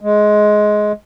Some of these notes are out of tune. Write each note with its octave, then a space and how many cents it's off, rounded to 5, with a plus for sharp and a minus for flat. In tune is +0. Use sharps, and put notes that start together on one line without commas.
G#3 +15